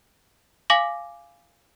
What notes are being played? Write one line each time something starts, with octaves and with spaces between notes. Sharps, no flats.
F5 G#5 D6 A#6 F#7